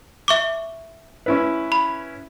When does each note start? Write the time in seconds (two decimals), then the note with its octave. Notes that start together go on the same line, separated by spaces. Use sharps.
0.28 E5 C#6 D6
1.26 C#4 E4 B4
1.72 B5